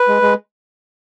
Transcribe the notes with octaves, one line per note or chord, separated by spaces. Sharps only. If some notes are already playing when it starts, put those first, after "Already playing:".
Already playing: B4
G#3
G#3